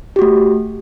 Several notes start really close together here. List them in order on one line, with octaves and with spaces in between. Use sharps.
G4 F#4 A3